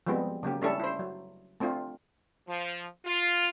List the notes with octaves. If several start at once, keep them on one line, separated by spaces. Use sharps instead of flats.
F3 G3 G#3 B3 C4
C#3 F#3 A#3 G4
G3 A3 C#4 D4 E4 A4
E4 C5
F#3
A3 C4 D4 F4
F3
F4